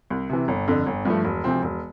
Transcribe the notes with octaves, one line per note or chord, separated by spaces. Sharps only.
C2
C3 E3
G1
F2 D3
G1
G2 F3 A3
E1
D2 C3 F3 C4
E1